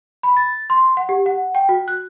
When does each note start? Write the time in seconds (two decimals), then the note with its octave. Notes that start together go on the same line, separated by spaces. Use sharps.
0.23 B5
0.37 A6
0.70 C6
0.97 F#5
1.09 G4
1.26 F#5
1.55 G5
1.69 F#4
1.88 F#6